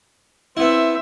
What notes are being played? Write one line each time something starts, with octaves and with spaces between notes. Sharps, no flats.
B3 C4 E4 E5